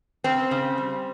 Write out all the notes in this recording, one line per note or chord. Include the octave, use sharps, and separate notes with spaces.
C#3 C4
C#3
G3